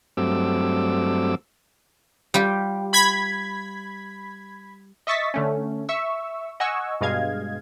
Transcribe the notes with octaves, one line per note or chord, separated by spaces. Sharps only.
G2 F#3 A3 C4 D6 E6
G3 F4 G4
B5 G#6 B6
D#5 E5 C#6 A6 B6
D3 A3 C#4
E5 C#6 E6
D#5 F#5 G#5 C#6 E6
G2 B2 G#3 D#5 F5 G#6